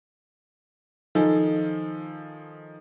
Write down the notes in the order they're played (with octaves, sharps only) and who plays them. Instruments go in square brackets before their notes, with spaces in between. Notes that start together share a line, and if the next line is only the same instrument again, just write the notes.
[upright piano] D#3 F3 D#4 G#4 A4